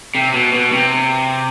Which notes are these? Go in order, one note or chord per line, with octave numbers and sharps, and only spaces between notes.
C3
B2
B2
C3